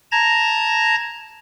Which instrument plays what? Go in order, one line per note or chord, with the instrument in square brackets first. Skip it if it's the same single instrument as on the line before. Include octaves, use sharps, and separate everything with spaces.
[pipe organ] A5 A#5 G#6 A#6